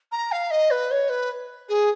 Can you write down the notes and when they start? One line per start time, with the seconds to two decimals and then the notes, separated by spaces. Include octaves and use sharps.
0.12 A#5
0.32 F5
0.51 D#5
0.71 B4
0.91 C#5
1.09 B4
1.69 G#4